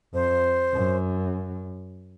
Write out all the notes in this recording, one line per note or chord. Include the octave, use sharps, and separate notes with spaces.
F2 C5
F#2